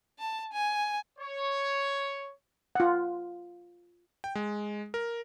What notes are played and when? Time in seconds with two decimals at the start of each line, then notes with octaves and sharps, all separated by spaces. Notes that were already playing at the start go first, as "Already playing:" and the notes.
0.19 A5
0.53 G#5
1.19 C#5
2.75 F4 F#5
4.24 G5
4.35 G#3
4.94 A#4